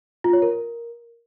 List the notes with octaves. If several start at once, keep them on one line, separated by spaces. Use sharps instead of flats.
F4
C#5
A#4